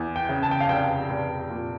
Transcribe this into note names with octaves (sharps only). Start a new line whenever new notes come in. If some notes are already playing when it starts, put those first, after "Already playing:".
Already playing: E2
G5
C#3
A5
G5
F5
F1 G5
F1
A#2